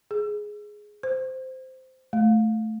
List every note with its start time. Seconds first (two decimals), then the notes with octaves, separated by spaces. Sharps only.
0.11 G#4
1.03 C5
2.13 A3